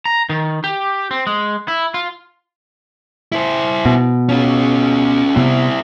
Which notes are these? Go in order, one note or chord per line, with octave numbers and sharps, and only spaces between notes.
A#5
D#3
G4
C4
G#3
E4
F4
E4 C5
B2
C#4 F4
C3 B3 C4 E4